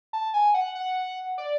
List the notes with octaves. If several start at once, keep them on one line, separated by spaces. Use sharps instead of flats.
A5
G#5
F#5
F#5
D5